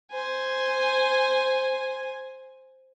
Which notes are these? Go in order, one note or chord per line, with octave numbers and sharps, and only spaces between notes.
C5 G#5